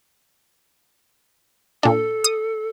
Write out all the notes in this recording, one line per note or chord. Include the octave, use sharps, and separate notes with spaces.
A#2 D4 A4
D#6